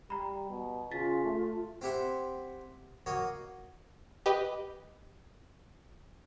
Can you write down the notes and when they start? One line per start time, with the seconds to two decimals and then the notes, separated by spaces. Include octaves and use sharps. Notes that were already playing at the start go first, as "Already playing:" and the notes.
0.10 G3 A#5 B5
0.50 B2
0.91 C#3 F4 A6 B6
1.24 A3
1.81 C4 E4 G4 E5 F#5
3.06 A#3 F#4 C#5 D#5
4.26 G4 B4 D#5